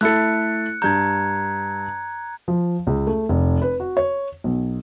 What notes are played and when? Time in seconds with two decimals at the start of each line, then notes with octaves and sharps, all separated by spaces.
0.01 A3 E4 A4 F#6 C#7
0.82 G2 A#5 G6 G#6
2.48 F3
2.87 C#2
3.07 A3
3.29 F1
3.62 B4
3.80 F#4
3.97 C#5
4.44 B1